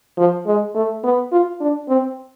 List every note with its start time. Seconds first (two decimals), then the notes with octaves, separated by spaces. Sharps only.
0.18 F3
0.46 G#3
0.75 A3
1.03 B3
1.32 F4
1.60 D4
1.89 C4